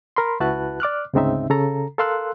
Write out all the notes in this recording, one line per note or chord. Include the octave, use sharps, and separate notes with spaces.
A#4 B5 C6
C#2 E4 F#4 B4 A5 F#6
D5 D6 F6 F#6
D2 G#2 C#3 C4 D#4 E5
C#3 A4 A#5
A4 A#4 F5 C6 E6 F#6